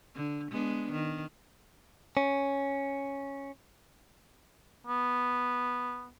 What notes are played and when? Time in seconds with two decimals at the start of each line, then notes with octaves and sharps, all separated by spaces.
0.15 D3
0.51 G#3 B3 D4
0.92 D#3
2.17 C#4
4.87 B3